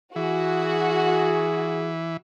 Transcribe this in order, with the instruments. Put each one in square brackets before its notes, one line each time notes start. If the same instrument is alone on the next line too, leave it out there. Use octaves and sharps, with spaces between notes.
[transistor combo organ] E3 [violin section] F#4 [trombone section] G#4